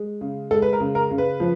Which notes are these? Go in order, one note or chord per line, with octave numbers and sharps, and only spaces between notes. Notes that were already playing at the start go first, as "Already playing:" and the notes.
Already playing: G#3
C#3
G#3 A4
B4
A#4
C#3
A#4
C#3
B4
F3